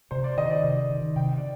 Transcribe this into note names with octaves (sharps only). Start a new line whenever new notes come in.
C3 C5
D5
D#3 D#5
C5
D5
C3 D#5
D#3
C3 G5
D5